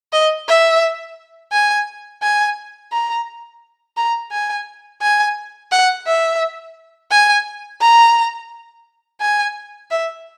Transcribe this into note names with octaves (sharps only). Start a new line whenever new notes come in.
D#5
E5
G#5
G#5
A#5
A#5
G#5
G#5
F#5
E5
G#5
A#5
G#5
E5